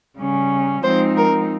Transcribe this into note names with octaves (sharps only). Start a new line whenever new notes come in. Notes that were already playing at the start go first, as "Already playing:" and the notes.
C#3 G3 C#4
F3 G#3 C4 D#4 C5
A#4